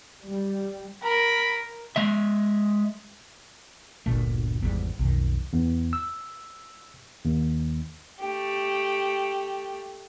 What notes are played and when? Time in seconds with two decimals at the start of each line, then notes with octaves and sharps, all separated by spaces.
0.24 G3
1.03 A#4 B5
1.96 G#3 E5
4.06 G1 D2 A#2 A3
4.61 G#1 E2 G#2 G3
4.99 B1 F2 D#3
5.53 E2
5.93 E6
7.25 D#2
8.20 A3 G4